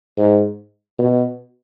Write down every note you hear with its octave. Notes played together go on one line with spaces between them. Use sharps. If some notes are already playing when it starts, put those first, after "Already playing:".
G#2
B2